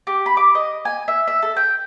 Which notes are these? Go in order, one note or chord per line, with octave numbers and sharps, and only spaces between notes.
G4
B5
D6
D#5
G#5
E5
E5
A4
G5